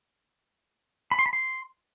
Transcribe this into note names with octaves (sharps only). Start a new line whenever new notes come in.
B5
C6
B5
C6